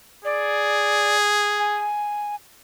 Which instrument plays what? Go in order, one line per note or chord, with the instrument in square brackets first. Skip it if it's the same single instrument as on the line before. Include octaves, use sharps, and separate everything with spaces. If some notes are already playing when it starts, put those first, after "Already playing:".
[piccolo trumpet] G#4 [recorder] D5
[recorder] G#5